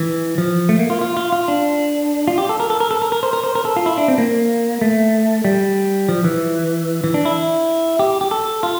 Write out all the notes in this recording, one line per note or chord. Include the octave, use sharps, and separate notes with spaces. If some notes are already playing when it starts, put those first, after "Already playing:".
Already playing: E3
F3
A3
A#3
F4
F4
F4
F4
D4
F4
G4
A4
A#4
A4
A#4
A4
A#4
A#4
C5
A#4
C5
A#4
A4
F4
E4
D4
C4
A#3
A3
G3
F3
E3
E3
D4
E4
G4
G4
A4
F4